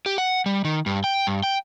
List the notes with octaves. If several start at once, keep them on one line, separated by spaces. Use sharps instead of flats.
G4
F#5
G3
D#3
G2
G5
G2
G5